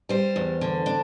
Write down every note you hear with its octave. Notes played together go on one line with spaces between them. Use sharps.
G3 C5
E2
D3
D4